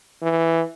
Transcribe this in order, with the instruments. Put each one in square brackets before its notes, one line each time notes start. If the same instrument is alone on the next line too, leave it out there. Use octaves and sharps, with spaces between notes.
[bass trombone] E3